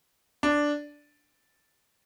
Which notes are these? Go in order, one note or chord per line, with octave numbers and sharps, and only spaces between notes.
D4